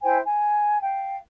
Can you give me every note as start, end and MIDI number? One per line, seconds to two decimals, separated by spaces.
0.03 0.18 64
0.03 0.18 72
0.03 0.18 79
0.03 0.18 80
0.25 0.78 80
0.83 1.17 77
0.83 1.17 79